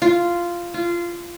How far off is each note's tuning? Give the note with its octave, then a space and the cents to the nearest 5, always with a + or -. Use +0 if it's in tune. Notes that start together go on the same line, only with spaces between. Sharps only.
F4 -10
F4 -20